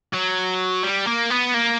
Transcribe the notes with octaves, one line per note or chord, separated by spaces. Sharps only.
F#3
G3
A#3
B3
A#3